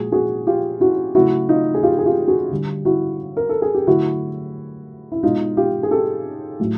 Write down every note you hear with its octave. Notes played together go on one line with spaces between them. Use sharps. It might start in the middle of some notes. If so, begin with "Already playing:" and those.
Already playing: A#2 F3 G#3 F#4 G#4
F#4 G#4
F4 G4
E4 F#4
C#3 F#3 A3 E4 F#4
D#4 F4
G#4
F4 G4
G#4
F4 G4
F#4 G#4
D3 G3
E4 F#4
A#4
A4
G#4
G4
D3 F#3 A3 E4 F#4
E4
B2 G#3 D#4 F4
F4 G4
G#4
G4 A4
A2 F#3 A3